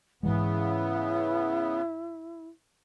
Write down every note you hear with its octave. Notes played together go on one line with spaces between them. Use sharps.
G#2 C#3 E3 G#3 B3 E4